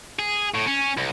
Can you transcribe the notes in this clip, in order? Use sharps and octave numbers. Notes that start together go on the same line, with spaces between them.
G#4
A2
C#4
C2